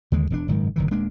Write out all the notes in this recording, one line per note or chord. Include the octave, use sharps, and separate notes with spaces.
D#2 D3 G#3
E1 A2 D4
F#1 G#2 D#3
F#1 D#3 E3
D#1 G#3 A#3 D4